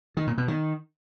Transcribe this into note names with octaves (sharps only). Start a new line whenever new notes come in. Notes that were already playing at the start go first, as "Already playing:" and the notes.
D#3
A#2
B2
D#3